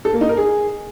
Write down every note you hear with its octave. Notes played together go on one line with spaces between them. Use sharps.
A4
A#3
D#4
A#4
G#4